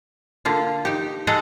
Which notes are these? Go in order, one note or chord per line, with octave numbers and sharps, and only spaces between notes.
D3 A#3 F4
D#4 G4
G#3 G#4 A4 D#5 F#5 A#5